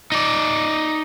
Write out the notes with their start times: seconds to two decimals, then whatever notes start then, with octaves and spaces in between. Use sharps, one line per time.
0.12 D#4 D5